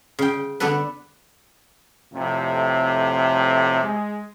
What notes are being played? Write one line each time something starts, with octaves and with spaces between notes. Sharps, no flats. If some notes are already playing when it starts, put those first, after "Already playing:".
C#3 G5
D3 B3 D4 A4 B4
F2 A2 C3
G#3